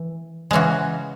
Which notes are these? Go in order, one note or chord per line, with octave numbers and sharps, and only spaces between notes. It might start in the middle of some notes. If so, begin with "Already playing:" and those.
Already playing: E3
C#3 E3 G#3 C#4 F#4